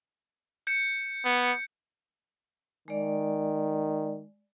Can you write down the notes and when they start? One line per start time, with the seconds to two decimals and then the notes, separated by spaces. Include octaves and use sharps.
0.67 G6 C#7
1.25 B3
2.88 D#3 G#3 D5